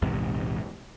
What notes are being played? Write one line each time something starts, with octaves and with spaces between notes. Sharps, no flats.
A#1 E2 G#2 C3